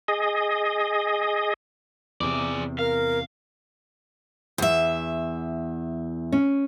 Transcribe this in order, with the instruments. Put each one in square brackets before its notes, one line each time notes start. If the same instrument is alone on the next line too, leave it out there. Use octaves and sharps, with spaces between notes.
[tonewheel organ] G#4 D#5
[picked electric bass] E2 C3 [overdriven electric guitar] G#4 D5
[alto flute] A#4 [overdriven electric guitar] F5
[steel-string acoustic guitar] E2 E5
[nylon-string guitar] C#4